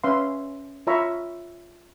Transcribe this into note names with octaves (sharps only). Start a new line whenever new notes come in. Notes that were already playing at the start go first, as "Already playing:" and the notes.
C#4 B4 E5 F5 C6
F4 C#5 E5 A#5 B5 C#6